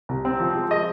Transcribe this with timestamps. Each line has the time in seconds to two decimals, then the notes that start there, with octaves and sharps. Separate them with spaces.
0.09 C2
0.25 C4
0.40 F3
0.56 G#3
0.71 G#3 D#5